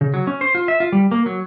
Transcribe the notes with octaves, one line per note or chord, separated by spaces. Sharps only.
C#3
F#3
C#4
C5
F4
E5
F4
G3
A#3
F#3